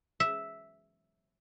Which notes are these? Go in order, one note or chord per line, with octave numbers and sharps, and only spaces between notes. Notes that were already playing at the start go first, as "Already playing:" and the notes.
E5